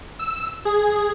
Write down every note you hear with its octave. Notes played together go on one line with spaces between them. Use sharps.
E6
G#4